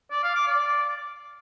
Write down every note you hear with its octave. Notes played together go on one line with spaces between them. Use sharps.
D5
F5
D6
D5